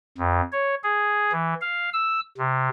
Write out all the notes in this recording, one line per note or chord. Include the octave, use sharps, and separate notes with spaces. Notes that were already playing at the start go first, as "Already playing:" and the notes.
F2
C#5
G#4
E3
F5
E6
C3